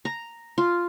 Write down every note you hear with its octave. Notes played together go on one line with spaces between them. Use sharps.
A#5
F4